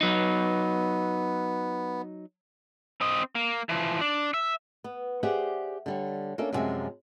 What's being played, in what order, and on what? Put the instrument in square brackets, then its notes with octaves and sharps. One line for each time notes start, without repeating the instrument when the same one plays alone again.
[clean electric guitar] F#3 D#4 [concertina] B3
[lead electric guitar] C4 D#5
A#3
E3 F3
D4
E5
[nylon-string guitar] B3
G4 G#4 C5 D5 E5 F#5
D3 G3 C#5
A#3 C#4 D4 A4 A#4 E5
F#2 A2 C3 F3 G#3 E5